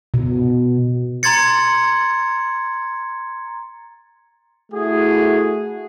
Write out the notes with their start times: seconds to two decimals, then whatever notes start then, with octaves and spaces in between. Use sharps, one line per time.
0.14 B2
1.23 A#5 C6 G#6 A6 C#7
4.73 A3 E4 F#4 G#4